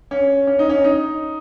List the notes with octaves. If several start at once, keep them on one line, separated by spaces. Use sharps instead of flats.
C#4
C#4
D#4
C#4
D#4